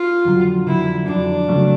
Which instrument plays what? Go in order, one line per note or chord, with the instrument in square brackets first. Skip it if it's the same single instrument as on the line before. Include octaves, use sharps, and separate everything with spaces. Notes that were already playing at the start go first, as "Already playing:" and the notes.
Already playing: [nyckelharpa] F4
[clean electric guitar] F2 D3 F#3
[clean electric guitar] F2 D3 F#3 [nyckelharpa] E4
[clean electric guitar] F2 D3 F#3 [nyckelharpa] D4
[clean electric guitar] C#3 F#3 A3 C#4